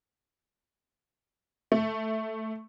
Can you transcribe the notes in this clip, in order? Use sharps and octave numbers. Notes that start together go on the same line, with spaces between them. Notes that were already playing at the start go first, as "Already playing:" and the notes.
A3